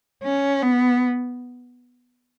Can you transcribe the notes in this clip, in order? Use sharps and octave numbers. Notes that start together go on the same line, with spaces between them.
C#4
B3